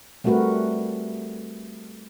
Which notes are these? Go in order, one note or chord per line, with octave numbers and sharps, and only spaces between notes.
G3 A3 C4 F#4 A#4 B4